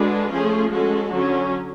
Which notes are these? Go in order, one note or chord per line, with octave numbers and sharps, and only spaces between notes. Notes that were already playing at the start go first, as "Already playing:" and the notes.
Already playing: D3 G#3 D4 F#4 B4
F3 A3 C#4 F4 G#4
G#3 C#4 F#4 A4
D3 F#3 C#4